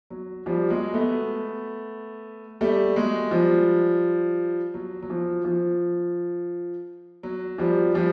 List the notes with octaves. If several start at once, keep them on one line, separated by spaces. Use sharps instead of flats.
F#3
F3 G3
F#3 G#3
A3 B3
G3 A3
F#3 G#3
F3 G3
F#3
F#3
F3
F3
F#3
F3 G3
F3 G3